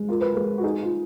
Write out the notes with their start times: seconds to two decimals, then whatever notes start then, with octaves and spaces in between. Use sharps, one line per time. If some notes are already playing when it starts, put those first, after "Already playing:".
Already playing: G#3
0.09 F4 A#4
0.21 B4
0.32 G#3 A#4
0.58 F#4
0.64 D#4 G#4
0.83 F4